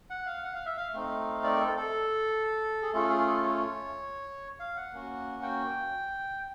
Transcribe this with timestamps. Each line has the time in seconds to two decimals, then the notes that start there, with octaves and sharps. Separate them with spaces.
0.10 F#5
0.27 F5
0.43 F#5
0.54 F5
0.66 E5
0.77 F5
0.93 A3 C4 D#4
1.43 D5
1.56 A#4
1.60 A4
1.77 A4
2.82 G#4
2.93 A3 C#4 F4 G#4 A4
3.10 G#4
3.27 A4
3.43 C#5
4.60 F5
4.76 F#5
4.93 A#3 C#4 F#4
5.43 G5